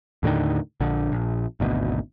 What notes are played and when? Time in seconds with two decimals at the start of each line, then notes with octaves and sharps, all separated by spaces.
0.23 D#2 A2 D3 D#3
0.80 A#1 D3
1.12 A#1
1.60 G#1 D2 B2